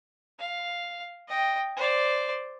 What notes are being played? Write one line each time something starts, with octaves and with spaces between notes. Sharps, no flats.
F5
D#5 G5
C5 D5